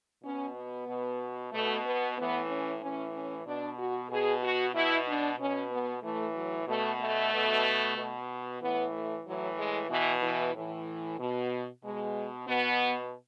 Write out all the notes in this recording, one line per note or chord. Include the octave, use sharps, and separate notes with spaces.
B2 C#4
B3
B2
B2 A3
B3
A2 E3 B3
C#4
A2 E3 C#4
C#4
B2 D4
F#4
B2 G#4
F#4
B2 E4
D4
B2 C#4
B3
A2 E3 A3
F#3
B2 A3
A3
B2
B2
A2 E3 B3
A3
A2 E3 F#3
G#3
B2 E3
E3
A2 E3
B2
B2 G#3
B2 B3